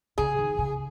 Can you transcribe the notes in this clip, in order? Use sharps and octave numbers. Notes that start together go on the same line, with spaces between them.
C#3 G#4
D#3
C#3